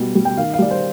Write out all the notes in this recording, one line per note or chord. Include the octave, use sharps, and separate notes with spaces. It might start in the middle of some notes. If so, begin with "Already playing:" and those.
Already playing: B2 G3
G3
G5
D#3 F5
F5
G3 D5
C5